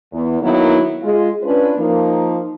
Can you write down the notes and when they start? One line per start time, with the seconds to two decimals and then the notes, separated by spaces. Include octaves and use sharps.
0.13 E2
0.41 D#3 F#3 A#3 B3 D#4 E4
1.03 G#3 F4
1.43 C#4 D4 F4 B4
1.76 F3 A#3 D#4